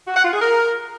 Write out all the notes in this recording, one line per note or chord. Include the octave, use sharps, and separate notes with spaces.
F#4
F#5
F4
G#4
A#4